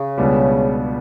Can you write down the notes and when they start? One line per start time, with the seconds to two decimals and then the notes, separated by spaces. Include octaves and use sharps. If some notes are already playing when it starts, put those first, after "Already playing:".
Already playing: C#3
0.18 C#2 B2 G3 B3 D4